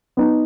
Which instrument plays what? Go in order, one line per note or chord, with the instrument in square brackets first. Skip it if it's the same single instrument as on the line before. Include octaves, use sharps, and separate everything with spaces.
[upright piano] B3 D#4